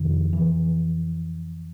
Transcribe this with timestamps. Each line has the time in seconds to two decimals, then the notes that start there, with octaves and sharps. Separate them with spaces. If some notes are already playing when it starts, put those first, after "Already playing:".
Already playing: F2 C3 D#3
0.33 E3